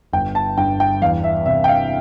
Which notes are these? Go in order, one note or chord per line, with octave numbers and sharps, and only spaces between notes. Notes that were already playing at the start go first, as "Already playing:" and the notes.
G1 G5
A5
G2 G5
G5
E2 F5
E5
C3 E5
G5
F5